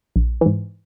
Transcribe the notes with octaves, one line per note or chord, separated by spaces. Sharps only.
A#1
G#2 E3